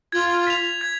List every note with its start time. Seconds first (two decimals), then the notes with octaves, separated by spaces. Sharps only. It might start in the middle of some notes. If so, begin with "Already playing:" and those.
0.12 F4 G#6
0.47 B6 F7
0.81 G#6